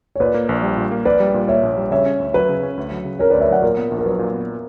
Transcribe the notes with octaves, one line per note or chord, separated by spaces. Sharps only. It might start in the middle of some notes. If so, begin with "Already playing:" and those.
C#5
A#2 B4 D5
A#3
A#1
G3
A#2
A#3
A#1 B4 D5
G3
A#2
A#3 C#5 E5
A#1
G3
C#3 C#5 E5
C#4
D2
F#3 B4
C#3
C#4
D2
F#3
C#3
C#4 A#4 C#5
D2 B4 D5
C#5 E5
F#3 D5 F#5
A#2 A#4
B3
A#1
A#4
F#3 B4
A#2
B3